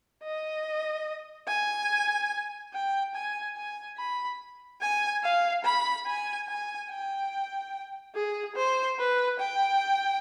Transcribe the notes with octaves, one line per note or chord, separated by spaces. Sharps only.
D#5
G#5
G5
G#5
G#5
B5
G#5
F5
B5
G#5
G#5
G5
G#4
C5
B4
G5